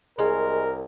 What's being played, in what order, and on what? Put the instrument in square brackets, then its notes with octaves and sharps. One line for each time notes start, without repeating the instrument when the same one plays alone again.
[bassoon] C2 [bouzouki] G#3 G#5 [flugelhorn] A#4